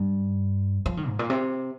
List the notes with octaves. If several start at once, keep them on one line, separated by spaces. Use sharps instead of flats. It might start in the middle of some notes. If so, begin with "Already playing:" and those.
Already playing: G2
F3
D#3
G#2
A#2
C3